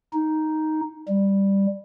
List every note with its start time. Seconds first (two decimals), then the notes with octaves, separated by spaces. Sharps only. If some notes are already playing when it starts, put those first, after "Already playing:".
0.13 D#4
1.08 G3